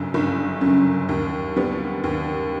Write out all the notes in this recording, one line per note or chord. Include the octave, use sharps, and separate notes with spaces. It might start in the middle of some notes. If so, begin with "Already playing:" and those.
Already playing: G1 F#2 C#3
G1
F#2 C#3
D#2
D3 G3 B3
D#2